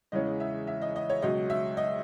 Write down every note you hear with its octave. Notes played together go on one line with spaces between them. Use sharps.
E2 C#3 E3 G#3 C#4 D#5
E5
E5
D#5
D#5
C#5
C#2 B2 F#3 D#5
E5
D#5